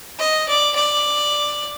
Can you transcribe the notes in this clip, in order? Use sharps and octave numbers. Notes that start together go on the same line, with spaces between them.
D#5
D5
D5